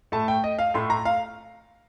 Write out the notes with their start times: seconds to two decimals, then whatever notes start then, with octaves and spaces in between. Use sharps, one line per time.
0.12 A2 A3 A5
0.28 G5
0.44 D#5
0.59 F5
0.74 A2 A3 C6
0.90 A#5
1.05 F5